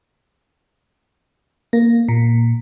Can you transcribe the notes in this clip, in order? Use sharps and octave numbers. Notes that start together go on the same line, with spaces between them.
A#3
A#2